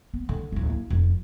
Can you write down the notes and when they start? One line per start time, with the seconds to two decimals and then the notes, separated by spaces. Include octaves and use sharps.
0.14 B3
0.29 D3
0.52 D1 C2
0.67 A#3 E4
0.90 F1 F3